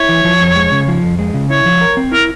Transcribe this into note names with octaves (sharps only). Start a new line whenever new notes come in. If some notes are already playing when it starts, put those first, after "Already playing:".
Already playing: E4 C#5
E3
F3
F2
G#3
C#3
F3
F2
G#3
C#3
E4 C#5
F3
A#4
C4
E4 A#4